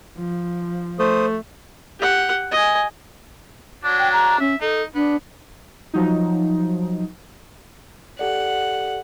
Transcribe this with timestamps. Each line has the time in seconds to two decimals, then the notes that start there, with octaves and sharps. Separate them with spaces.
0.18 F3
0.99 A3 C5 D#6
2.00 G4 F#5
2.51 D#5 G#5
3.84 F#3 D4
3.99 G5
4.13 A#5
4.40 C#4 E5
4.62 D#4 A4
4.95 B3 D4
5.94 F3 F#3 D#4
8.19 G4 A4 D5 F#5